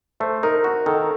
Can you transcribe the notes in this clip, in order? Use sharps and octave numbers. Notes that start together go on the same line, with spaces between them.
A3 C5
D#4 A#4
F#4
D#3 A4